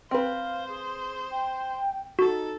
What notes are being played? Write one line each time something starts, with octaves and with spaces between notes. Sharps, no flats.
C4 B4 C5 F5
G#4
G5
D#4 F#4 A4